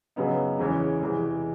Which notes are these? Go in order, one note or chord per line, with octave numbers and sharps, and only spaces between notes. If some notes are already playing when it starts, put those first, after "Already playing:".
F#2 C#3 F#3 B3 D#4
E2 C#3 E3 G#3 C#4
E2 C3 E3 G#3